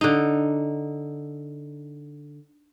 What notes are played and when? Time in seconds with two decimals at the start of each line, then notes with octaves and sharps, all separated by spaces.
0.01 D3 D#4